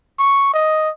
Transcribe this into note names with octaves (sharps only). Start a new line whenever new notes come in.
C#6
D#5